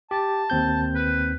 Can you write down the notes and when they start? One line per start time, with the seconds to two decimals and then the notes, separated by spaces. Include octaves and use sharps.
0.11 G4 A5
0.50 D#2 C4 G6
0.95 B4